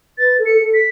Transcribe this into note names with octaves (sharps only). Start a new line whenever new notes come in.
B4 A6
A4
C#7
A4
B6